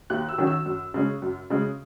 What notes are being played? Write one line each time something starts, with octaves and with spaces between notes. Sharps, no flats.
D#2 F#6
E6
D#3 F#3 C#4
E6
F#2
C#3 G#3 C#4
F#2
C#3 G#3 C#4